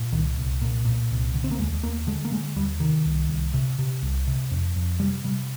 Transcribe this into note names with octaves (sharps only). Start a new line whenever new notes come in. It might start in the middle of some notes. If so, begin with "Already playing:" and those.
Already playing: A#2
C2 D#3
C2
A#2
A#2
C2
D3
C4
A#3
D#2 G#3
D#2 A#3
D3 G#3
A#3
D3 G#3
D#2 G3
C3 D#3
C2
C2
C3
C3
C2
C3
F2
F2
C3 G3
C3 G3